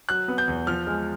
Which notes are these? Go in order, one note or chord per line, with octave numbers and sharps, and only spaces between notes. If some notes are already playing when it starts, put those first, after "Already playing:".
F#3 F#6
B3
G6
E2
F3 F6
G#3